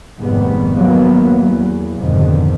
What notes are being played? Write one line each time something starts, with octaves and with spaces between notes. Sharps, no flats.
F1 G#2 D#3 G3 B3
D#2 F#3 A#3 B3
E2
B1 F2 G#2 B2 D3 D#3